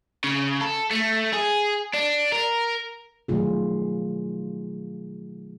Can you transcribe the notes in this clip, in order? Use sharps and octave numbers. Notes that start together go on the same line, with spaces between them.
C#3
A4
A3
G#4
D4
A#4
B2 D#3 F#3 A3 F4 G#4